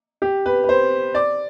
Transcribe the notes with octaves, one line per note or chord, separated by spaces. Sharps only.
G4
B4
B4
C5
D5